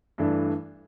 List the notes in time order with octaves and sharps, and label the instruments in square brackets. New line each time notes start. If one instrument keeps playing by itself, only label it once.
[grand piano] G2 E3 A3 D4